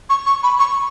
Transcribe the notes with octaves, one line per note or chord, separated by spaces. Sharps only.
C#6
C#6
B5
C#6